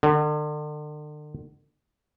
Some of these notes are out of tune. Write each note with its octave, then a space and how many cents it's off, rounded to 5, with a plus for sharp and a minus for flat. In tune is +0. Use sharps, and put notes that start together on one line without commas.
D3 +40